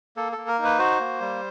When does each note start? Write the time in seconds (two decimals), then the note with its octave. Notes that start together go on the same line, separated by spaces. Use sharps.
0.17 A#3 A4
0.32 A4
0.38 A#3
0.48 A#4
0.59 D#4
0.64 B4
0.79 F#4 C5
1.00 A#3
1.21 G3